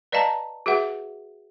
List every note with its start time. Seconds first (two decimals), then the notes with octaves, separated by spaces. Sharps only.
0.12 B4 D5 D#5 F5 A5 A#5
0.66 F#4 G#4 B4 E5 F#5